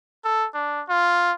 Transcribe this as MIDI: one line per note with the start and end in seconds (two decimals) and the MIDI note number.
0.24 0.47 69
0.54 0.82 62
0.89 1.33 65